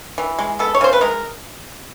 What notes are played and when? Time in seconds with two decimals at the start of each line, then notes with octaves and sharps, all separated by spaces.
0.18 E3
0.39 G#3
0.59 B3 A4
0.75 C#5
0.81 C#3 C5
0.93 B4
1.01 G#3 A#4